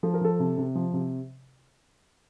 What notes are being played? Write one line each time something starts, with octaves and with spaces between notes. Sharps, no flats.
F3 A4
A#4
F3 A4
C3
C3
F3
C3